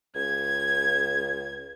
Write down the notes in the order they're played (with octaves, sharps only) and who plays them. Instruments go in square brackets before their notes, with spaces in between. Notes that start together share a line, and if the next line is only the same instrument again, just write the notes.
[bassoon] C#2 [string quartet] G#6